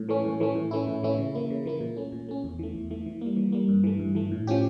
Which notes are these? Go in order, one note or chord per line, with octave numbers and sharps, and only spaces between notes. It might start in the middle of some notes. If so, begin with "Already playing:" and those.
Already playing: A2
E3 A3 C#4
A2
E3 A3 C#4
A2
E3 A3 C#4 E4
A2
E3 A3 C#4 E4
C#3
E3 A#3 E4
C#3
E3 A#3 E4
A#2
A3 C#4
A#2
A3 C#4
E2
E3 A3
E2
E3 A3
E3
G3 A#3
E3
G3 A#3
G2
E3 A3
G2
E3 A3
A2
F3 C#4 G4